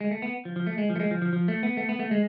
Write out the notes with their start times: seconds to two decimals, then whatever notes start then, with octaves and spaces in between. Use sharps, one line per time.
0.01 G#3
0.11 A3
0.22 B3
0.45 F3
0.56 F3
0.66 A3
0.78 G#3
0.90 F3
0.96 A3
1.00 G#3
1.11 F3
1.22 F3
1.33 F3
1.48 A3
1.63 B3
1.77 A3
1.89 B3
2.00 A3
2.11 G#3